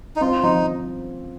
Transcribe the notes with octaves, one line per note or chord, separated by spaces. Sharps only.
D#4
C4 F4
F3 D#4